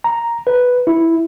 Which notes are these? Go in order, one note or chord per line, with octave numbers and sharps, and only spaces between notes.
A#5
B4
E4